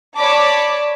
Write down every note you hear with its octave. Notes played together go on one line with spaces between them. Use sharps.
C#5 D5 A5 B5 D6